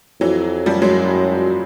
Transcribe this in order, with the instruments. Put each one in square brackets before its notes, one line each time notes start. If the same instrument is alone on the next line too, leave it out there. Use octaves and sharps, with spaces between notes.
[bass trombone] F2 [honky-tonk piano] E3 F#3
[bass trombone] F#2 [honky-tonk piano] F3 G3
[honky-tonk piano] F#3 G#3